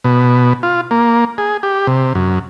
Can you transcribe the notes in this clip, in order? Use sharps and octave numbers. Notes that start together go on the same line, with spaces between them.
B2
F4
A#3
G#4
G4
C3
F#2